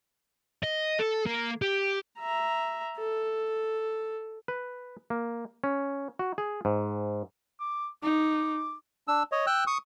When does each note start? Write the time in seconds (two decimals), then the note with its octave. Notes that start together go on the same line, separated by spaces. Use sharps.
0.63 D#5
0.99 A4
1.26 A#3
1.62 G4
2.19 E5 A#5
2.98 A4
4.48 B4
5.10 A#3
5.64 C#4
6.19 F#4
6.38 G#4
6.65 G#2
7.60 D6
8.03 D#4 D6
9.08 D4 E6
9.32 C#5 D#5
9.47 G5 E6 F#6
9.67 C#6 D#6